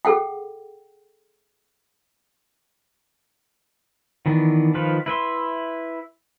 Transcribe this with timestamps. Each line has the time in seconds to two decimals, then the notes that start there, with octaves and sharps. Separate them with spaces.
0.05 G#4 A4 F#5 G5
4.26 D#3 E3 B3 D4
4.74 D#3 F3 F4 B4
5.06 E4 B4 E5 C6